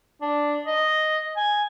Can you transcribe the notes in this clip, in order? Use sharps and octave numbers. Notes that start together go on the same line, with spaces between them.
D4
D#5
G#5